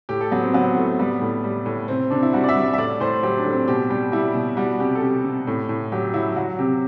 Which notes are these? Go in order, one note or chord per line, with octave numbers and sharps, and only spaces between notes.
A2 G4
A4
F#3 B3
C4
F#3 B3
A2 A3
G3 B3
A2
G3
A2
C3 C4
C3 D4
E4
G3 F#4
D5
E5
G3
D5
E5
A2 D5
A2 C5
F#3 G4
D4
A2
C4
B2 G4
G3 G4
G3 E4
B2
G3 F#4
C3 G4
A4
C3 G4
C3
A2
A2
F#3 G4
F#3 E4
F#3 F#4
C3 G4